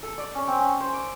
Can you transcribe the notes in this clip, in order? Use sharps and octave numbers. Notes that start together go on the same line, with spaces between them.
A4
D5
C#4
C4
C#4
C5
D6